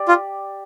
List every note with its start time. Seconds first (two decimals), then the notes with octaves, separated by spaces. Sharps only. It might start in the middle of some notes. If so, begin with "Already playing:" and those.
Already playing: G4 D5
0.08 F4